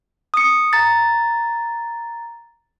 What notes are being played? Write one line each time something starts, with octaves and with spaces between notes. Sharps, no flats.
D#6 C#7
A#5 A6